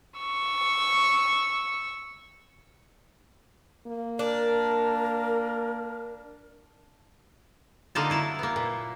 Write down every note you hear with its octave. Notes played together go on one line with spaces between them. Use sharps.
C#6 E6
A#3
D4 A#4
D3 A#3 D#4 F4 A5
F#3 E4 A5
A#3 B3
A#2